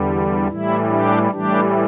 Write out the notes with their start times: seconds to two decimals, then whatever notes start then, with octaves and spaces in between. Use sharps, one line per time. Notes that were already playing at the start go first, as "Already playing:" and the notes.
Already playing: E2 D3 G3
0.48 A2 E3 G3 E4
0.89 D4 G4
1.31 A2 E3 G3 D4 G4